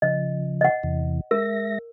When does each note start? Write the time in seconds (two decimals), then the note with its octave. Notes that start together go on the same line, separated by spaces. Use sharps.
0.02 C#3 F3 D#5
0.61 D#5 F#5
0.83 E2 C3 E3
1.31 G#3 A#4 E5 A#6